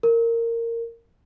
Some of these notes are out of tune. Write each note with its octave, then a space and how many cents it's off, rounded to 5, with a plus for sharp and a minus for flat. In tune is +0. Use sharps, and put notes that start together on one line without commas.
A#4 -15